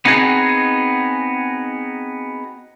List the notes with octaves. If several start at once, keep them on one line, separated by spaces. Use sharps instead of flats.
B3 C4 D#4 F#4 G#4